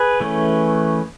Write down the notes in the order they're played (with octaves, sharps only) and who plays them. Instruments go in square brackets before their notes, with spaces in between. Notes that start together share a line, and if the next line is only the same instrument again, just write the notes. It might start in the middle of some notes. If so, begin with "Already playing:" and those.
Already playing: [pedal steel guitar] G#4 B4
E3 A3 C#4